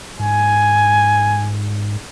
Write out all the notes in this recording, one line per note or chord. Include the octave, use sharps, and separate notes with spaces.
G#2 G#5